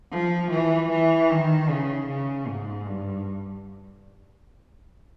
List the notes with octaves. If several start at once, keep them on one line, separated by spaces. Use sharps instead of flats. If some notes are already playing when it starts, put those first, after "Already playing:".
F3
E3
E3
D#3
C#3
C#3
G#2
G2